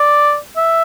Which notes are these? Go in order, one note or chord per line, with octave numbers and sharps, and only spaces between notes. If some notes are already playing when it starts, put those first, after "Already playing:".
Already playing: D5
E5